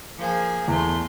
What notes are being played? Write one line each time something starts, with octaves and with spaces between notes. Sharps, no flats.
F3 A#3 G#4
E2 A3 C6